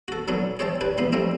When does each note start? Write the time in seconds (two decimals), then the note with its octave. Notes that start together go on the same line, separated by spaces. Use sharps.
0.08 F#4 A4
0.28 D3 F#3 B3 C#4 D4
0.59 G#4 C5 C#5 E5 G5 A5
0.81 D4 G4 B4
0.98 E2 B3 B5 C6
1.13 F3 G3 A3 C4 D4